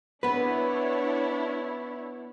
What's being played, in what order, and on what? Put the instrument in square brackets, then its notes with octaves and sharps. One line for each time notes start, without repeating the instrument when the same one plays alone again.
[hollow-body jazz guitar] B3 B4 [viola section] D4 E4 C#5